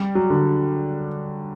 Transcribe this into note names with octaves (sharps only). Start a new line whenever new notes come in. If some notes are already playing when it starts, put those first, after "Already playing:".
Already playing: G3
F#3
D3